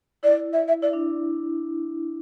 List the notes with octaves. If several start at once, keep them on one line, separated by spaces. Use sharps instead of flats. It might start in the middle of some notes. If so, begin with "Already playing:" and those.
E4 D5
E5
E5
E4 D5
D4